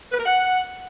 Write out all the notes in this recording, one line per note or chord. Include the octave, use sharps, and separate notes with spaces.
B4
A#4
F#5